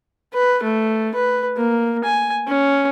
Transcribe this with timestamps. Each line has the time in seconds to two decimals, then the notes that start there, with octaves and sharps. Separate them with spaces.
0.34 B4
0.63 A3
1.14 B4
1.57 A#3
2.04 G#5
2.47 C#4